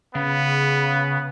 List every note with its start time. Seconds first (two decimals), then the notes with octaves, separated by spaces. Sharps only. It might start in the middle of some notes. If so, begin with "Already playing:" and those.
0.15 C#3 B3